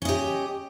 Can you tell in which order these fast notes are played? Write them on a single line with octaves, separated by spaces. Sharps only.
C#4 D#5 G4